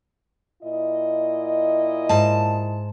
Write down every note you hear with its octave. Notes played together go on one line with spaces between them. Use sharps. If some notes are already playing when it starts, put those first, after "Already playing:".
A#2 E4 D#5
G#2 A5